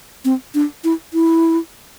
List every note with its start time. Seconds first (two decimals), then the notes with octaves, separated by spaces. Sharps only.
0.25 C4
0.54 D4
0.84 E4
1.14 E4